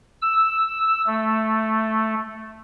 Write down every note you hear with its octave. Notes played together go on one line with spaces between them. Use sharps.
E6
A3